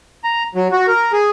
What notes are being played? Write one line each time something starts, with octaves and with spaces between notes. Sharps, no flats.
A#5
F#3
F#4
A#4
G#4